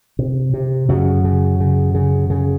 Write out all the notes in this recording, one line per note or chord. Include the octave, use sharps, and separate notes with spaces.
C3
C3
F#2 C#3 F#3
C#3
C#3
C#3
C#3